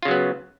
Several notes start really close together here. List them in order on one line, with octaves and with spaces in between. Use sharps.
F4 C#3 F#3 B3